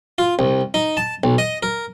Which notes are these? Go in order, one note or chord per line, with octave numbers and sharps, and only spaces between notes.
F4
C2
D#4
A5
B1
D#5
A#4